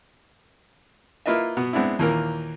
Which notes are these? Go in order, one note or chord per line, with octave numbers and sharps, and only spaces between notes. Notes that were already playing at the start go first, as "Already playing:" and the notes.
A#3 E4 F4 B4 D#5 E5
B2 B3
G#3 B3 C4 D4 E4
D#2 A#2 E3 A#3 A#4